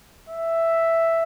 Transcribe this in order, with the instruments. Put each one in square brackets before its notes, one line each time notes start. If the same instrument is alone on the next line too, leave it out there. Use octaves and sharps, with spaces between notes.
[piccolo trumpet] E5